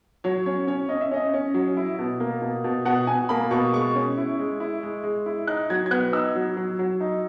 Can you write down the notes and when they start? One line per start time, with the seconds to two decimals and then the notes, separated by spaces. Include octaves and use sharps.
0.24 F#3 C#5
0.46 C#4 C#5
0.67 C#4 C#5
0.89 C#4 D#5
1.01 E5
1.11 C#4 D#5
1.34 C#4
1.54 F#3
1.77 E4
1.99 B2
2.20 A#3
2.42 B2
2.64 B2
2.85 B2 F#5
3.07 B2 G#5
3.29 A#3 B5
3.51 B2 C#6
3.73 G#3 C#6
3.95 C#4
4.17 E4
4.39 G#3
4.60 E4
4.83 G#3
5.03 G#3
5.26 E4
5.47 D#4 F#6
5.70 F#3 G#6
5.86 G#6
5.91 B3 F#6
6.13 D#4 E6
6.35 F#3
6.57 F#3
6.79 F#3
7.00 D#4